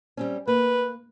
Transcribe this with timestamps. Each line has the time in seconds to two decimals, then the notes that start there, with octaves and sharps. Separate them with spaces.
0.17 G3 C4 C#4
0.47 A#3 B4